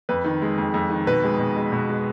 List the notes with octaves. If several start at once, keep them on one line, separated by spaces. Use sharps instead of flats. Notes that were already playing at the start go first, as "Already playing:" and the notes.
F2 B4
D#3
G#3
F2
F2
D#3
B2 B4
G#3
B2
G#3
B2
G#3